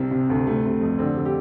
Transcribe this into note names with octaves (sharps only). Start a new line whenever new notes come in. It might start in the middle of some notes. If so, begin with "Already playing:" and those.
Already playing: C2 C3 C4
C3
D2
C3 A3
C3
F2
D3 C4
D3
G4